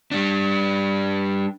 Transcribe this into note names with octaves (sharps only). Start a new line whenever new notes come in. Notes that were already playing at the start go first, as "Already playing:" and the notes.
G3 D4